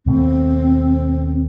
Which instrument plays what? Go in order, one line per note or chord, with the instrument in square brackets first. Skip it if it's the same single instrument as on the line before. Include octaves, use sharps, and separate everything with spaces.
[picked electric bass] D#2 B2 A3 [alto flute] C4